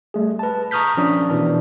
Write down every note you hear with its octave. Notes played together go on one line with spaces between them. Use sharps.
G3 A3 G#4
B4 A5
A#5 C#6 D#6 F6 G6 B6
F3 C#4 D4 D#6
B2 E3 D4